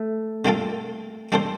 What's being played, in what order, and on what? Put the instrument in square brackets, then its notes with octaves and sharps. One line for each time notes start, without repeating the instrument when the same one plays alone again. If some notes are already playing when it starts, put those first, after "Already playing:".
Already playing: [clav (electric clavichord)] A3
[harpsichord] D3 G3 A#3 F4 A4
G3 A#3 D4 A4 C5